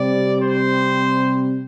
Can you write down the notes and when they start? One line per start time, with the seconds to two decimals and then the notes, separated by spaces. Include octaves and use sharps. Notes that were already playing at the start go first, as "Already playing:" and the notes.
Already playing: C3 G3 C4 D5
0.42 C5